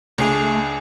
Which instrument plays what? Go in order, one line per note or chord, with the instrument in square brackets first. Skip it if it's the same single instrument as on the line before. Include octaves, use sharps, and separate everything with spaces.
[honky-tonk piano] C#2 C7 F7 [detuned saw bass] A3 [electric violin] D4 G#4